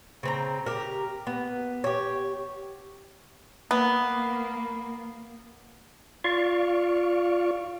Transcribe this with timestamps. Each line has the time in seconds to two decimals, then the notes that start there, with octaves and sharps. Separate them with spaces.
0.23 C#3 C4 A#5
0.66 G4 A#4
1.27 B3
1.84 G4 C#5
3.71 A#3 B3
6.24 F4 D5 F5 C#6